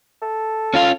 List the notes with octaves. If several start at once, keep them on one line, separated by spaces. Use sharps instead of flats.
A4
C#4 F4 F5